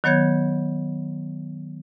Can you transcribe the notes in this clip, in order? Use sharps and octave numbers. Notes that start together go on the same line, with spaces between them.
D#3 F#3 B3 C#5 G6 G#6